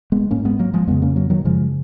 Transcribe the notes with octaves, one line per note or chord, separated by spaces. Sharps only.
G#3 B3
G#2 A#3 C#4
G#3 B3
F#3 A#3
F3 G#3
F2 C#3 G#3 B3
A#3 C#4
F#3 A#3
D#3 F#3
F#2 C#3 F3 G#3